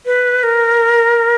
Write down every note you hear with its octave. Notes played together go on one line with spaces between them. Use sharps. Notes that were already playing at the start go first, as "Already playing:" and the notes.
B4
A#4